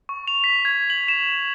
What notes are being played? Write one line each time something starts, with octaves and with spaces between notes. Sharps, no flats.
C#6
F7
B6
G#6
F#7
E7